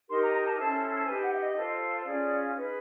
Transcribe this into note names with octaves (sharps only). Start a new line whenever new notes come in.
D#4 G4 A#4 C6
A#5
A#5
A5
C#4 E4 A4 C5 A5
A5
D#4 G4 B4 G#5
F#5
E5
D#5
F4 A4 C5
C#4 F4 G#4 D5
D#4 G#4 B4